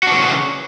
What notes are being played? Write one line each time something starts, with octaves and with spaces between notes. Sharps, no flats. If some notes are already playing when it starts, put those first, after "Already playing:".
C#3 E3 D4 F#4